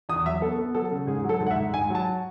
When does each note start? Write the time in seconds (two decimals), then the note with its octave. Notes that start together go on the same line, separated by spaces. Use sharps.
0.09 E2 D#6
0.26 F#3 E5
0.41 B3 A4
0.59 B3
0.75 F#3 A4
0.91 C#3
1.07 G#2 G#4
1.24 F#3
1.29 A4
1.40 G#2
1.47 F#5
1.51 E5
1.56 G#2
1.73 G#2 G#5
1.90 F#3 A5